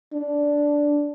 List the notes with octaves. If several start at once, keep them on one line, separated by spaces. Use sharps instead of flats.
D4